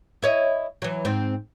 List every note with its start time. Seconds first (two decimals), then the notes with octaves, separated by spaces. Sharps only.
0.22 E4 C#5 D#5
0.82 E3 F#3
1.05 G#2 C4